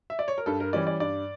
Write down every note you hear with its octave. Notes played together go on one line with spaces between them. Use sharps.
E5
D5
C#5
A#4
G2 A4
A#4
E3 G3 C#4 D5
D5
G2 D5